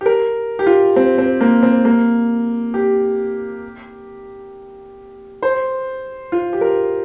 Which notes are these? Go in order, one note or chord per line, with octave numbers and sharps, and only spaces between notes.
G4
A#4
G4
F4
C4
C4
A#3
C4
A#3
G4
C5
F4
G4
A#4